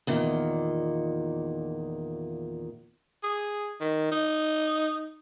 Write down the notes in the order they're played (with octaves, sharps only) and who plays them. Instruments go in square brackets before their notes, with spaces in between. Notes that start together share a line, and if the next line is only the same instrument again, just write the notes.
[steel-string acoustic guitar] E2 A#2 D#3
[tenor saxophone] G#4
D#3
D#4